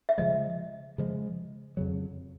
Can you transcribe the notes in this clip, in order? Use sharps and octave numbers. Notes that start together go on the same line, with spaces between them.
E5
C#3 F3 G#3 D#5
C#3 F3 G#3
F2 C#3 F#3